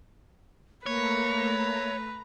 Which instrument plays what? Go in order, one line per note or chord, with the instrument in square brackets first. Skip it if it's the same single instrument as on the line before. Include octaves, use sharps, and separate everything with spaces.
[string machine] A3 A#5 [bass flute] A#3 [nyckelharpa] B4 [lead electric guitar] C#5